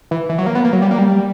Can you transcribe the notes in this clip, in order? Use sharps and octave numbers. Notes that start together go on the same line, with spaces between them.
E3
E3
F#3
A#3
B3
A#3
F#3
G3
A#3
G3